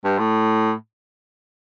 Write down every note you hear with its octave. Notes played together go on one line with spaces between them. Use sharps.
G2
A2